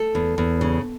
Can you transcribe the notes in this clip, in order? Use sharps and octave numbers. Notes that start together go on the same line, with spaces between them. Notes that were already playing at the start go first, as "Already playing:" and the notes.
Already playing: A3 A4
E2
E2
C#3